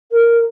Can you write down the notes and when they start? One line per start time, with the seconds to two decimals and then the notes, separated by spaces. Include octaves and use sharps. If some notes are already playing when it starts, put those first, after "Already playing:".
0.10 A#4